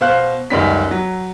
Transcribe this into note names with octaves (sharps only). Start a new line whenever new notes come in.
B2 C5 F5 F#6
C#2 F#2 D#3 G3 C#4 B6
F#3